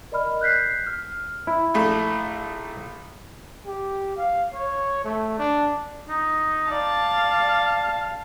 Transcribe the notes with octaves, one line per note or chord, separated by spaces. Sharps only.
A#4 D5 D#5 B5 F6
F#6 G6 B6 C7
F6
E4
A#1 A3
G4
F5
C#5
A3
D4
D#4
D5 F5 A5